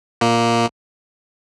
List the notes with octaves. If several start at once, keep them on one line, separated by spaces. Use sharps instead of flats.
A#2 A#3